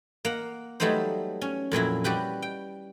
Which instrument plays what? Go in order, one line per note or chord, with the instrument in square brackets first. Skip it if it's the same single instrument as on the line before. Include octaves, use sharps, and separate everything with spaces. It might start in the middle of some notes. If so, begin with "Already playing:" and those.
[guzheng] A#3 F#5
F#3 G3 A3 B3 D#4 C5
C#4
F2 A#2 F#3 E4
G3 F#4 G4 B4
G5